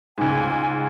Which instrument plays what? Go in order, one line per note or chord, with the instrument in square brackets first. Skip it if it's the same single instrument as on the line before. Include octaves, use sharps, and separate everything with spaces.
[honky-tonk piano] C#2 G#2 [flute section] G#5